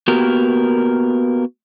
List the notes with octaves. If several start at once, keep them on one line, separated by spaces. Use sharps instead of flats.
A#3 B3 F#4 G4 A#4